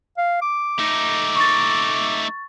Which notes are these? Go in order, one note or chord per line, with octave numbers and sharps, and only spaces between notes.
F5
D6
A3 D#4
C#6 A6